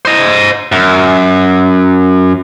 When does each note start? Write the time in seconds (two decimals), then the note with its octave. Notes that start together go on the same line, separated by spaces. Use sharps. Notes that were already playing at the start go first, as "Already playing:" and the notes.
0.05 C5 D#5
0.72 F#2